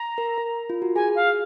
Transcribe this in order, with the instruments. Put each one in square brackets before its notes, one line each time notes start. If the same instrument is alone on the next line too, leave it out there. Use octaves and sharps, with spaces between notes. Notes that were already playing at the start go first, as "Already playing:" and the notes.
Already playing: [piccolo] A#5
[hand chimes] A#4
A#4
F4
F#4
[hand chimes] G#4 [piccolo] G#5
[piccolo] F5